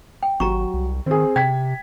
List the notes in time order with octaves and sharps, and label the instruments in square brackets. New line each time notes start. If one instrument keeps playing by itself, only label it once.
[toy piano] G5
[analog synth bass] G#1 [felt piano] F#3 [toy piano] G4 A#5 C#6
[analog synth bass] C2
[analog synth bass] D#3 [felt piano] C4 G#4
[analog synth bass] C3 [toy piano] G5 [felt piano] G#6 B6